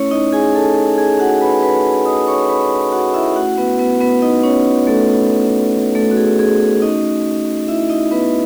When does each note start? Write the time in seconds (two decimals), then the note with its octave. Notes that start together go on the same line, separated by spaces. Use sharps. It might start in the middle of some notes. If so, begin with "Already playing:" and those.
Already playing: A3 C#4 E4 C#5
0.11 D#4 D#5
0.33 G#4 G#5
0.55 A4 A5
0.98 G#4 G#5
1.20 F#4 F#5
1.41 B4 B5
1.63 B4 B5
2.06 D#5 D#6
2.27 C#5 C#6
2.49 B4 B5
2.92 F#4 F#5
3.14 E4 E5
3.36 A3 C#4 E4 F#4 F#5
3.58 B3 B4
3.79 B3 B4
4.01 B3 B4
4.22 D#4 D#5
4.43 C#4 C#5
4.87 A3 A4
5.95 A3 A4
6.11 F#4
6.17 G#4
6.39 G#4
6.60 G#4
6.82 A3 C#4 D#4 F#4 D#5
7.68 E4 E5
7.89 D#4 D#5
8.11 B3 B4